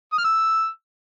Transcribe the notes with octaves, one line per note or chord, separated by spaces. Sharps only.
D#6
F6
E6